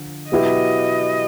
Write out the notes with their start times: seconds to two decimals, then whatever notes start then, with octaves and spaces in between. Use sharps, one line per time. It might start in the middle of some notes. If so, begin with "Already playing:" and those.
Already playing: D3 F3
0.31 B2 F#3 B3 E4 G4 D#5